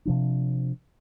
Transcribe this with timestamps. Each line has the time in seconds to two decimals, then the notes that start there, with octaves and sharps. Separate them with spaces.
0.05 C3 F3 D4